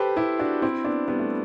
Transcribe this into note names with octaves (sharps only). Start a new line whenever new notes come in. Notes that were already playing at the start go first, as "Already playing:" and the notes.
Already playing: G4 A4 B4 C5
E4 G4
D4 F#4
C4 E4
B3 D4
G3 B3
A3